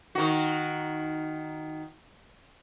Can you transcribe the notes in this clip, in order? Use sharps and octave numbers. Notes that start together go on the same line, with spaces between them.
D#3 F#4